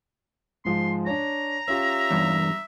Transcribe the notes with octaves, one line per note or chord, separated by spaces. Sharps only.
G#2 F3 G#3 C6
D4 C#5 A#5
C#4 F4 G4 E5
E2 G2